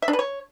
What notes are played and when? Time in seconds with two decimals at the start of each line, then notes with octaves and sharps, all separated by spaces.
0.02 E5
0.08 D4
0.13 B4
0.19 C#5